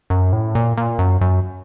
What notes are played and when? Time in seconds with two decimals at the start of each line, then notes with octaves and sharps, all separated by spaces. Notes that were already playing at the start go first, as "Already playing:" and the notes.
0.10 F#2
0.33 A2
0.55 A#2
0.77 A#2
0.99 F#2
1.21 F#2